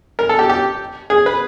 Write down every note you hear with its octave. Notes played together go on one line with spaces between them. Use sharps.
A#4
A4
G4
G4
G#4
B4